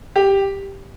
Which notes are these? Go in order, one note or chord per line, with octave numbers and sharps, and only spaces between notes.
G4